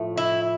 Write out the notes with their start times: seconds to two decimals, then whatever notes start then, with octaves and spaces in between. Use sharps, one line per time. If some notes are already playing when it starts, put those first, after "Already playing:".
Already playing: A2 F3 A3
0.17 E4